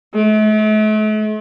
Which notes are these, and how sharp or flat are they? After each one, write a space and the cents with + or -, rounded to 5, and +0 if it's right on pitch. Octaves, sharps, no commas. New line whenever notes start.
A3 -45